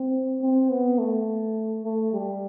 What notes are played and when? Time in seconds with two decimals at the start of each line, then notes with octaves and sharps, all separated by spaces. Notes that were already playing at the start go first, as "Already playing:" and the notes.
Already playing: C4
0.41 C4
0.70 B3
0.98 A3
1.84 A3
2.13 G3